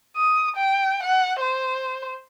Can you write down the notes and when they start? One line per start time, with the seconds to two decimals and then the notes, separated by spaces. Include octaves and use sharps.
0.16 D#6
0.57 G5
1.03 F#5
1.41 C5